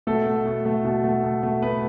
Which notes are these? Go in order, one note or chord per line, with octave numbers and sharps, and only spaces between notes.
B2 A3 A4
A3
B2
A3
B2
A3
B2
A3
B2 B3 B4